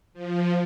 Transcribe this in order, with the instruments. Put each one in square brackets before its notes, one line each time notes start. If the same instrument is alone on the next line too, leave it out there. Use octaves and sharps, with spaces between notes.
[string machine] F3